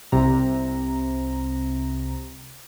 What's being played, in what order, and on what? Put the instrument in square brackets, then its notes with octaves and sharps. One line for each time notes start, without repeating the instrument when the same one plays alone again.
[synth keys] C2 C3 A#5